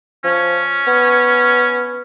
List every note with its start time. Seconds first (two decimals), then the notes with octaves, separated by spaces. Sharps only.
0.24 F3 C#4
0.87 B3